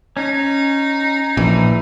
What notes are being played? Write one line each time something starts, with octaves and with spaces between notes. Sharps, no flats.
C#4 D#4
A#1 E3